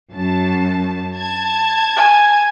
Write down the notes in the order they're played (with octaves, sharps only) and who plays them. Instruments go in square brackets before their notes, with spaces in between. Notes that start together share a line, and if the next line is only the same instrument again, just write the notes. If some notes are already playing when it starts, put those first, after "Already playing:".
[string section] F#2 A5
A5 G#6
[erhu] G#5